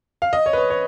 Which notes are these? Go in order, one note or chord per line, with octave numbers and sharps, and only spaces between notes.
F5
D#5
C#5
B4
C#5
C#5